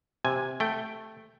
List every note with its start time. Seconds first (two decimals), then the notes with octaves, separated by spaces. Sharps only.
0.25 C3 G#5
0.60 A3 G5